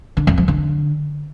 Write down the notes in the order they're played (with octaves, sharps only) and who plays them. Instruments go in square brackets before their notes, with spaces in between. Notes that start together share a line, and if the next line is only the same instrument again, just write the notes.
[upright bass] D3
F2
F3
D3